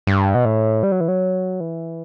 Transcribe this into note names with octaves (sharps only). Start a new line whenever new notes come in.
G2
B2
A2
G3
F#3
E3
F#3
E3